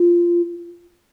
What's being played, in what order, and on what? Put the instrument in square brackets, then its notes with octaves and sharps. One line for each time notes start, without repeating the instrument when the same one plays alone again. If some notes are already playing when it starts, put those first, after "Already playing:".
Already playing: [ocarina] F4